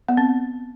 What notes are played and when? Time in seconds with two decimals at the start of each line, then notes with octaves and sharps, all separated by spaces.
0.08 B3
0.17 C4